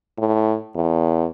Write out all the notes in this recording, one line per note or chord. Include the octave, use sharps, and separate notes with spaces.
A2
E2